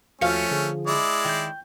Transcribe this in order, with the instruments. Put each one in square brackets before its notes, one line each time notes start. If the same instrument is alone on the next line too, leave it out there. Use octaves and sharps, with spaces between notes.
[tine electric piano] D#2 F#4 C#7 [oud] F3 F5 [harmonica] A3 C#4
[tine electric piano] D3 G#4
[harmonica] G#3 E4 D5
[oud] D#3 [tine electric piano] G5 G6